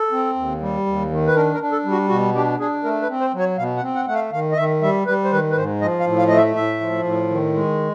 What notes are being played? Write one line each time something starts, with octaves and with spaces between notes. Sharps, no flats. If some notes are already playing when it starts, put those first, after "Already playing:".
Already playing: A4
C4
D#2
G3
D#2
D#3
B4
D4 A#4
A#4
D4
A4
G3
F#4
B2 F#4
D4 G4
D4 G#4
A3 A#4
B4
C4
C5
F#3
C#5
B2 F5
F#5
C4
F#5
A3 F#5
F5
D#3 F5
D#5
D#3 E5
G3 E5
G3 B4
C5
D#3 B4
B4
G#2 C5
F3 D#5
F5
A2
F5
A3 D#5
E5
A2 E5
F3
A2
D#3
G#3